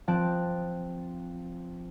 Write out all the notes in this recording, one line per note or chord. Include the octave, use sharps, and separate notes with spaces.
F3 C4 A5 F#6 D7